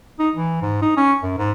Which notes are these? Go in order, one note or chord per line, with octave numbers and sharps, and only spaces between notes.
D#4
E3
G#2
D#4
C#4
F#2
G#2